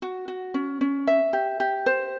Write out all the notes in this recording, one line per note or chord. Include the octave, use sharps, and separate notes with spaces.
F#4
F#4
C#4
C#4
E5
G4
G4
C5